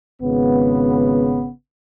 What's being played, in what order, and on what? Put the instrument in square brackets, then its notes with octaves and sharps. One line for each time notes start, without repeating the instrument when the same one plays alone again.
[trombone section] G#1 C#3 B3